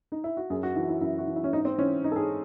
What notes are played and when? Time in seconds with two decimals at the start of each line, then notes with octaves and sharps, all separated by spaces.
0.12 D#4
0.24 E4
0.37 F#4
0.50 F#2 G#4
0.63 F#4
0.76 E3 F#4
0.89 E4
1.01 F#2 E4
1.18 F#4
1.27 E3
1.36 E4
1.44 C#4
1.53 G#2 D#4
1.65 C4
1.78 E3 C#4
2.03 G#2 D#4
2.12 A4
2.16 G#4